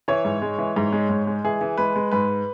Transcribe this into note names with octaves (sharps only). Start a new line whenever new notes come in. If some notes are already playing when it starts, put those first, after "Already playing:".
E3 C#5
G#2
G#3
E3
G#2
G#3
G#2
G#3
E3 G#4
E3
G#3 B4
G#3
G#2 B4